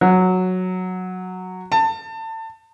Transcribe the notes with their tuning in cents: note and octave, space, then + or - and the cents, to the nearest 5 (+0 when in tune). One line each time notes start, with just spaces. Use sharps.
F#3 -5
A5 +25